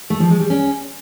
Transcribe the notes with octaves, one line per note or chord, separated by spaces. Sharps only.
A3
F3
G#3
G3
C#4